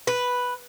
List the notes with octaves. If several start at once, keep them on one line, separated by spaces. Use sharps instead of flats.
B4